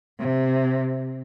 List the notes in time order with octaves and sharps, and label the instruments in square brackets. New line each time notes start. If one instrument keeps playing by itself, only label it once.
[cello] C3